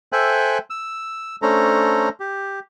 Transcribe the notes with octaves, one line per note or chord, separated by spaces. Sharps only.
A4 C5 E5 G5 G#5 F#6
E6
A3 C#4 D4 A4 C5 A#5
G4